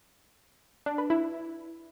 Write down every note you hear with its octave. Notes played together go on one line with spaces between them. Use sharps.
D4
B4
E4